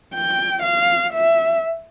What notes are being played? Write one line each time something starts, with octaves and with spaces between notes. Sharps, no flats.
G5
F5
E5